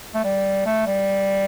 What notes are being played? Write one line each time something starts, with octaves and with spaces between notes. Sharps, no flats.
A3
G3
A3
G3